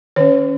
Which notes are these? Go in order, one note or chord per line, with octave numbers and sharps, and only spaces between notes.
D#3 C#4 C#5